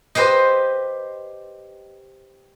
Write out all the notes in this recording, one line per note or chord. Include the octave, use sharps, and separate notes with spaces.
G4 B4 C5 D#5